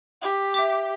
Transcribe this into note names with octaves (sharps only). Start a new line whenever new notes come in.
G4
E5 D6